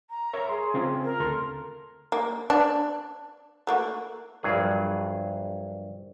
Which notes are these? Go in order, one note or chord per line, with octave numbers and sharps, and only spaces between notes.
A#5
A#4 C#5 E5
G#4 C6
C#3 C4 F4
A#4
D2 A4 C6
A#3
D4
A3 A#3 F#4
A#1 G2 F#3 G#4